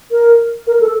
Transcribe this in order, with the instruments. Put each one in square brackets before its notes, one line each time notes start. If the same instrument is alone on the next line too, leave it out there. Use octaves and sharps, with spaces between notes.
[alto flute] A#4
A#4
A4